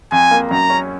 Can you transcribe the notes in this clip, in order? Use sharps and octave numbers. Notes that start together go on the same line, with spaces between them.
F2 G#5
A#3
F#2 A#5
C#4